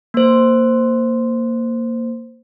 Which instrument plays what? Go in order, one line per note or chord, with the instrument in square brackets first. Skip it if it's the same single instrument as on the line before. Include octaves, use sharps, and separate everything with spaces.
[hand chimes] A#3 C5